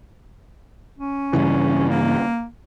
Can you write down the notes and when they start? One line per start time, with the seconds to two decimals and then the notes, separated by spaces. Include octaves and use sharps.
0.98 C#4
1.33 G2 C#3 E3
1.89 A#3